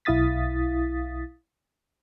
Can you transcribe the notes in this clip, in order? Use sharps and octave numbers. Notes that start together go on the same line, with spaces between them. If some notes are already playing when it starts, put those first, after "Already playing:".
B1 E4 F5 D#6 A6 B6